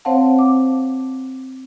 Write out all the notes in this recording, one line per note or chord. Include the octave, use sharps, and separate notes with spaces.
C4 C5 C#5 F5 F#5 A5
D6